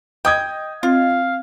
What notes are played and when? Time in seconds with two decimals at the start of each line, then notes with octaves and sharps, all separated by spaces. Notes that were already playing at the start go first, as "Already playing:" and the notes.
0.25 D#5 G5 D#6 G#6
0.83 C4 F4 F5